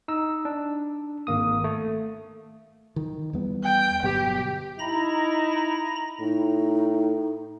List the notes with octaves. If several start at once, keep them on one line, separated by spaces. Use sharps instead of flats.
D#4 E6
D4
G#1 A#3 D#6
A3
D#3
E2 G3 B3
G5
G1 B2 F#3 G4
D#4 E4 A#5 B5 A#6
A2 D#4